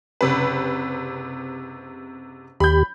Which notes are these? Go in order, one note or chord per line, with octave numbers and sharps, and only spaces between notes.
F#1 C3 B4
D#2 G4 B5 G6